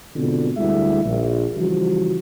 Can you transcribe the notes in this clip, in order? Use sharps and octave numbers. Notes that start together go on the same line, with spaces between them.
G#2 B2 D3 C4 F4
D2 G3 G#3 E4 E5
A#1
C#3 E3 F3 G3 F#4